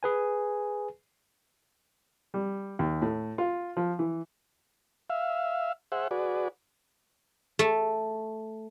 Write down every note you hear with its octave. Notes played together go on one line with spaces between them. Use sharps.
G#4 B4 G#5
G3
D#2
A2
F4
F3
E3
E5 F5
G#4 C5 E5 F#5
F#4 G#4 B4 D5
A3